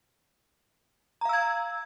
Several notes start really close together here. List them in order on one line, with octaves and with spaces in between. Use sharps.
A#5 F5 E6 G#6